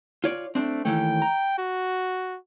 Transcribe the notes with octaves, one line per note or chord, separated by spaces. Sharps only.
F4 C#5 D5
A3 C4 D4
D#2 E3 A3 G5
A#5
F#4